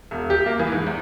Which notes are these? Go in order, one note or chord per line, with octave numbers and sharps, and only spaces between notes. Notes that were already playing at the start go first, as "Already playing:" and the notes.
E1
G4
A#3
E3
G#2
E2